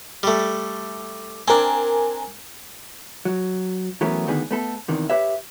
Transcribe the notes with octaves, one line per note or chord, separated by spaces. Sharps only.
G3 A3
C4 D4 A#4 G#5
F#3
E3 F#3 A3 B3 C#4 A#4
D2 D3 D#3 B3 G#4
A3 B3 A4
E2 C3 D#3 E3
G4 B4 C#5 E5